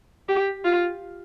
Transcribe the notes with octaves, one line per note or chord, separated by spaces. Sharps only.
G4
F4